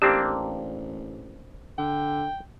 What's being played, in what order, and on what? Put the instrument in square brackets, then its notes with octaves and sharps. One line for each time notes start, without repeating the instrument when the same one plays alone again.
[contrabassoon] A1 [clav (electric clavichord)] A#3 C4 D4 [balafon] G4
[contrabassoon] D3 [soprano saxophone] G5